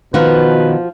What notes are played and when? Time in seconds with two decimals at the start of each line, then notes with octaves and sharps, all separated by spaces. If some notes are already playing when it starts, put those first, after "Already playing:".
0.14 B2 D#3 F3 F4 F#4 B4